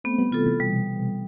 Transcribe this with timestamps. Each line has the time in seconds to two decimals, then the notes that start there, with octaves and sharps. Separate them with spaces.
0.04 A3 B3 C4
0.18 G3 B3
0.31 C3 E3 F4 A4
0.46 C3 E3
0.60 B2 G3